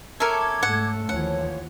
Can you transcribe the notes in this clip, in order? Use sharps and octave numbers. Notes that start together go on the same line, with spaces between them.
C#4 A4 A#4 E5 C#6 D6 G#6
G#2 A3 F#5
D#2 E3 F3 C#5 F#5